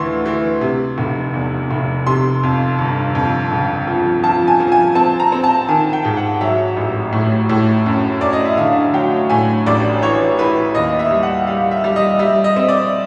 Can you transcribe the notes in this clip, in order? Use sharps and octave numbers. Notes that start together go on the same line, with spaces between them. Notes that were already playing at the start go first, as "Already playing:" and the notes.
Already playing: D2 E3 C6 C#6
E3
C3
F1
E2
F1
C3 C6
F2
G1
F2
C#2
F3
F3 A5
G#5
F3
G#5
C4 A5
A#5
C4
A5
D#3 G#5
G5
G#2
F#5
F#3 E5
A1
A2
A2
F#2
F#2 D5
D#5
E5
D3 F5
F#3 G5
A2 G#5
A1 D5
E3 C#5
E3 B4
D#2 D#5
E5
G3
F#5
G3 F5
E5
G3
D#5
G3 E5
D#5
C4
D5